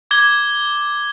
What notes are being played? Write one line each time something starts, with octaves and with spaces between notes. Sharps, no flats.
D6 G#6 G7